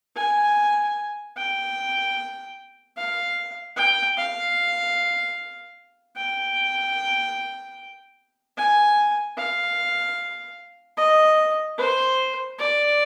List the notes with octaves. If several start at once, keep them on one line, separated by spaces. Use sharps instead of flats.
G#5
G5
F5
G5
F5
G5
G#5
F5
D#5
C5
D5